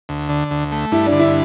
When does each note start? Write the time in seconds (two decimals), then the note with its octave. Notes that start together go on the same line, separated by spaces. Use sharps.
0.09 D2
0.29 D3
0.51 D2
0.72 A3
0.92 G2 E4
1.06 D4
1.12 D3
1.19 E4